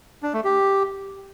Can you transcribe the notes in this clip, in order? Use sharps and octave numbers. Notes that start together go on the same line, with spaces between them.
D4
A3
G4